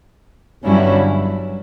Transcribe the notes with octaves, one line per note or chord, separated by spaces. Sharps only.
G1 G2 F#3 C#4 E4